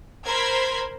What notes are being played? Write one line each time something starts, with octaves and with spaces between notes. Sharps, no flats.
A#4 C5 B5 C6 G#6 B6